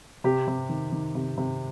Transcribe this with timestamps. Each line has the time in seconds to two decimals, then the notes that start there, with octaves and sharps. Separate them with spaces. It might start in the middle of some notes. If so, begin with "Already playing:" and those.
0.24 C3 G4
0.48 C3
0.69 D#3
0.92 D#3
1.15 C3
1.38 C3